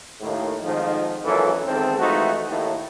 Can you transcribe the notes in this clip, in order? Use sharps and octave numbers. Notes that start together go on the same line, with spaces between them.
D#2 A2
F2 G#2 D#3 F3
G#1 F#2 A#2 E3 A#3 A4
E2 G#2 D#3 C4 A4
E3 F3 G#3 A3 D#4 F#4
D#2 A2